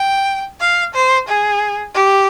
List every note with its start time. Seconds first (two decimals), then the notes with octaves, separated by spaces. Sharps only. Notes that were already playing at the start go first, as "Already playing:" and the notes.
Already playing: G5
0.60 F5
0.94 C5
1.28 G#4
1.95 G4